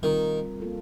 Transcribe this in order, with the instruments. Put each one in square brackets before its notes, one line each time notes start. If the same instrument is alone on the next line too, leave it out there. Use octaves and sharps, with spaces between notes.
[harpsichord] D#3 [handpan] G3 C4 F4 A#4
[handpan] A#3 F4 A4